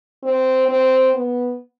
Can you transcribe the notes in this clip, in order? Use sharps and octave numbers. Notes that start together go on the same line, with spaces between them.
C4
C4
B3